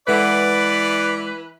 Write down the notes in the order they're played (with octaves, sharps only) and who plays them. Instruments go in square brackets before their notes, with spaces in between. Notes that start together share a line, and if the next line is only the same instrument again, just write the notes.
[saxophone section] E3 B4 [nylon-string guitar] G#3 A4 F#5 [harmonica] D5